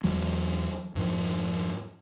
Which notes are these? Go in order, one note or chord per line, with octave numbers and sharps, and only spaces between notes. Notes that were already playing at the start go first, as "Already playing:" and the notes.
E2 E3 F#3 G#3
F2 G#2 F3